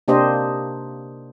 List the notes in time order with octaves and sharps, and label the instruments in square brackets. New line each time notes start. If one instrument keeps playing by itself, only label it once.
[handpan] C3 A#3 D4 G4 C5 D#5